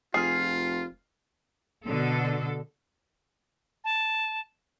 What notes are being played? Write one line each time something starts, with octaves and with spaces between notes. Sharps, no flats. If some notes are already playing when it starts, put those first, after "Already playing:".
F1 F4 G#4 F6 C7
B2 D3 A4
A5